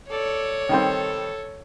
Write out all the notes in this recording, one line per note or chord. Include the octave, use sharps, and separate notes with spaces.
A4 C#5 D5
D#3 G3 C4 A4